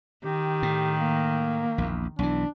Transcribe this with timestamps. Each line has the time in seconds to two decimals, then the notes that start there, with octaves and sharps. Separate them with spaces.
0.25 D#3 G4
0.63 A2
0.99 A#3
1.78 A#1 E2
2.19 B1 E3 D4